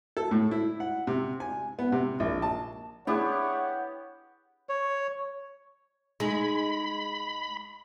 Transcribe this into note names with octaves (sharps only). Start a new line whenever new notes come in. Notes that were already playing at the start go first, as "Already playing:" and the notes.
A4
A2
E4
F#5
C3
G#5
B3
C3
A#1
A5
B3 D4 E4 G4 G#4 C#5 F#5
C#5
G#3 D#4 B5